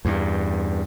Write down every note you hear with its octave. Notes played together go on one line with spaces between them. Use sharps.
E2 G2